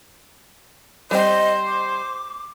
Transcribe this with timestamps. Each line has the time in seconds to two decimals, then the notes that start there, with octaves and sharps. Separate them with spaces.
1.11 G3 C4 G4 C5 D#5
1.65 D6